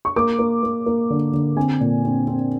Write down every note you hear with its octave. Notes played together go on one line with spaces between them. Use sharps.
C#6
A#3 D6
A#3
A#3
A#3
D3
D3
C4 G#5
A#2
C4
C4